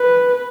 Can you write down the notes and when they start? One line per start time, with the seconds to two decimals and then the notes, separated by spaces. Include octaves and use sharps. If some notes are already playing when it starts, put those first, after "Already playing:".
Already playing: B4